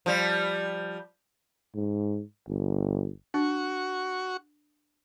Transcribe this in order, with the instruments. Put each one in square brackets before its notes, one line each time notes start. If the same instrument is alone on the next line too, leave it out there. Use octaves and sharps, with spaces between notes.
[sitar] F3 G3
[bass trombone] G#2
G1
[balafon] D4 [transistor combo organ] F#4 C#6